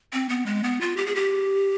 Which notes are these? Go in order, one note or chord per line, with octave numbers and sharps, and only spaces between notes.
C4
B3
G#3
B3
F4
G4
G#4
G4